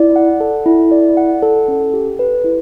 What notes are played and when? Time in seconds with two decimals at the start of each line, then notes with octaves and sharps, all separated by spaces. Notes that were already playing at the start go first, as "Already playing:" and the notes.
Already playing: E4 D5
0.16 F#5
0.40 A4
0.66 E4
0.91 D5
1.17 F#5
1.42 A4
1.68 C#4
1.94 G4
2.19 B4
2.44 E4